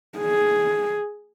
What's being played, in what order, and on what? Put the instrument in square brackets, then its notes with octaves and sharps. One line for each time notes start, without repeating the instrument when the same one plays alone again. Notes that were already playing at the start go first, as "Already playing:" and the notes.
[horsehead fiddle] G#4